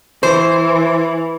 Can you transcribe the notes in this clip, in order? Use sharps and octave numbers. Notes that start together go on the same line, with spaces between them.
E3 C5